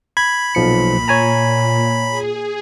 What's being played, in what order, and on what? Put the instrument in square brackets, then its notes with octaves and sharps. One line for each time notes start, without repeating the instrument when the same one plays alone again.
[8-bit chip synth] B5 [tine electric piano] G#6
[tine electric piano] B1 F3 C#7 [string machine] A#2
[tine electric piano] C#5 G#5 A#5
[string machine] G#4